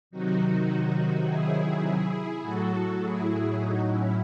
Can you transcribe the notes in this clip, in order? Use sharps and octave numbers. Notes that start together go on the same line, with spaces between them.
C3 D#3 F#3 D#4 F#4
E4 G#4
A2 F#3 F#4 A4
E4 G#4
D#4 F#4
C#4 E4